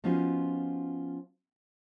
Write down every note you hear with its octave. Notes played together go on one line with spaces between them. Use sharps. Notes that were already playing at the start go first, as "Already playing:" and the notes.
F3 B3 C#4 D#4 F4 F#4